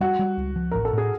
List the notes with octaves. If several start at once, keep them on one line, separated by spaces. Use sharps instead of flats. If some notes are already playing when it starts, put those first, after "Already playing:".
G3 F#4
G3
C#2
F3
A1 A#4
A4
A2 G#4